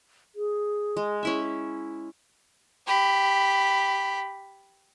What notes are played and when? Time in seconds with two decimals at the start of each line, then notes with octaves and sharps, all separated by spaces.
0.36 G#4
0.97 G#3
1.23 C#4 E4 E5
2.87 G4 B5